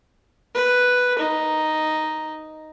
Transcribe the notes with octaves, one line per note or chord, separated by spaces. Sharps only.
B4
D#4